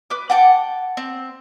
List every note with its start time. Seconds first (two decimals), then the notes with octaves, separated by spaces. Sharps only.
0.10 B4 D6
0.30 F#5 G5 A5 D6
0.97 C4